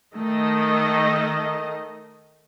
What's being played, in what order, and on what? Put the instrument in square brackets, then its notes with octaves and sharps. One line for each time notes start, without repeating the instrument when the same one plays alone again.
[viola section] D#3 A3 D#5